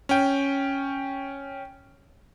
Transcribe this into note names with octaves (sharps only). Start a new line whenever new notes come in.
C#4 G5